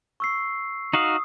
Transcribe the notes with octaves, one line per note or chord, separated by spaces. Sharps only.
C#6 E6 C7
D#4 F#4 F5 D#6